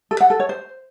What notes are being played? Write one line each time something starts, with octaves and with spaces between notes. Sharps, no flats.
A4
F#5
A4
C#5
C5